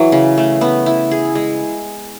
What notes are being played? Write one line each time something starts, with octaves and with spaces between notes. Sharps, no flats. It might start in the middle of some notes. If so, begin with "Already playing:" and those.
Already playing: E3 F#3
C#3
A3
B3
E4
G#4
G#3